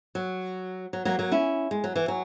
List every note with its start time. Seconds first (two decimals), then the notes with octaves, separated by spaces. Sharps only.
0.15 F#3
0.93 F#3
1.05 F#3 A#3
1.19 F#3 A#3
1.32 C#4 E4
1.71 G#3
1.84 F#3
1.96 E3
2.08 F#3